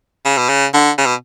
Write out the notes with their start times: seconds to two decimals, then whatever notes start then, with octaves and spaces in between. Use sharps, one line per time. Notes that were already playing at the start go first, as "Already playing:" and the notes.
0.25 C#3
0.38 B2
0.49 C#3
0.74 D3
0.98 C#3
1.06 B2